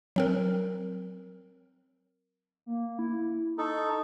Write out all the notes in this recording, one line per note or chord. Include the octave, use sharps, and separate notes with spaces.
F#3 C4 A#4
A#3
E4
D#4 A4 C#6